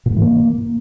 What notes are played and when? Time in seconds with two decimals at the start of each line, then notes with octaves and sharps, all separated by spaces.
0.06 A#2
0.11 G#2
0.16 E3
0.22 A#3